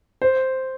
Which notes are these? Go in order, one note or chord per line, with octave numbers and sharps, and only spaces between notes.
C5